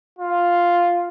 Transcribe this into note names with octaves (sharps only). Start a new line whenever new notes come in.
F4